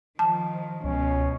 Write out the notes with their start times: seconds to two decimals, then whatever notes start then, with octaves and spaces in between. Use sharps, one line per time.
0.19 D#3 F3 A5
0.84 C#2 B2 C#4